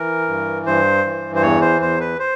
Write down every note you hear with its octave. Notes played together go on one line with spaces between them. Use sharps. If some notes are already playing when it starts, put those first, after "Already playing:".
Already playing: E3 A#4
G2
G2 C5
E3
C5
E2 C#5
C5
E2 C5
B4
C5